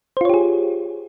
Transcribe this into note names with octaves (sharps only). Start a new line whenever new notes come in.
F4 G4 G#4 C5 C#5